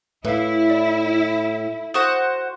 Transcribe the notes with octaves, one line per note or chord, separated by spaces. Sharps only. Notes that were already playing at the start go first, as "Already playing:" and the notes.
A2 E4 B4 F5
D5
F#4 C5 F#5 D#6